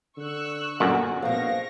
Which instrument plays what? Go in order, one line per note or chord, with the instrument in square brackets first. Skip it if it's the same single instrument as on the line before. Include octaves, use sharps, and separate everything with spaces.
[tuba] D3 [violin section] C#6 E6 F#6
[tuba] G1 [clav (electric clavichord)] F#2 A#2 [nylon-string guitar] D3 [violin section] F#4
[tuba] A#1 [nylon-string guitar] B2 F3 [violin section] F5 C#6 A#6